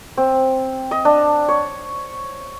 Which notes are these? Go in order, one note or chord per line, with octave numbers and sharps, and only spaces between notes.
C4
D#5
D4
C#5